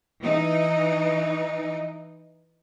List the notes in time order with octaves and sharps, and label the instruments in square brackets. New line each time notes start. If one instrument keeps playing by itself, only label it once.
[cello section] E3 D#4